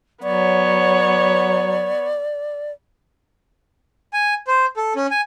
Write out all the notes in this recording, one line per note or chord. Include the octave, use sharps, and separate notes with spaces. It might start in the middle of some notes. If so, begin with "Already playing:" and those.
F#3 B3 C#5 D5
G#5
C5
A4
C#4
G#5